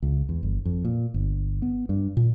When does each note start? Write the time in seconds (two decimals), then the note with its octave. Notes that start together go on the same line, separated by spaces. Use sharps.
0.02 C#2
0.29 E2
0.43 G1
0.65 F2
0.85 A#2
1.14 G1
1.62 B3
1.89 G2
2.17 A#2